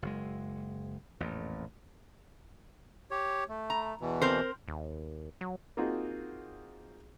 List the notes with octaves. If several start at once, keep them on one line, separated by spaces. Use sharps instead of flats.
F#1 G#3
A1 F2 A#2
G4 C#5
A3
A#5
E2 B2 E3
C4 A#4 C5
D#2
F#3
A#3 C4 D#4 F4 F#4 G#4